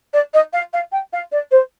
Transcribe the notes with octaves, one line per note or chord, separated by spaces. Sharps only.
D5
D#5
F5
F5
G5
F5
D5
C5